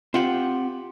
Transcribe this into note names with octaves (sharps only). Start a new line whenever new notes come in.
C4 F4 G4 F#5